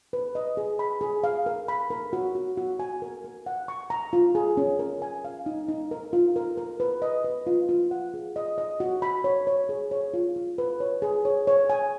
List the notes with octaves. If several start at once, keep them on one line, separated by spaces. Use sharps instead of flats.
B4
D#5
G#4
B5
G#4
F5
A#4
B5
A#4
F#4
F#4
F#4
G#5
A#4
A#4
F#5
C#6
A#5
F4
G#4
C#4
A#4
G#5
F5
D#4
D#4
A#4
F4
A#4
A#4
B4
D#5
B4
F4
F4
F#5
G#4
D#5
D#5
F#4
B5
C#5
C#5
G#4
C#5
F4
F4
B4
C#5
G#4
C#5
C#5
G#5